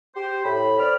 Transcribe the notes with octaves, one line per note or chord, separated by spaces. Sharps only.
G4 C5
A2 B5
C4 D5 F6